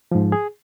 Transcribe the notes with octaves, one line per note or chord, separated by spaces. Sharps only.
G#2 F3
G#4